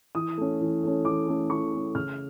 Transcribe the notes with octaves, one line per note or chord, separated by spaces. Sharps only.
E3 D#6
A3 C#4
E3
A3 C#4
E3 D6
A3 C#4
E3 C#6
A3 C#4
C#3 F6